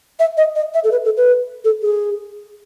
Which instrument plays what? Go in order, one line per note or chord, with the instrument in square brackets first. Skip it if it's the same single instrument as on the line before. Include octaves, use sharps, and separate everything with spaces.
[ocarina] E5
D#5
D#5
E5
A4
B4
A4
B4
A4
G#4